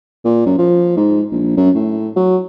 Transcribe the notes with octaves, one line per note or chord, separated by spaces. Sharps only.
A#2
F#2
F3
G#2
A#1
F#2
A2
F#3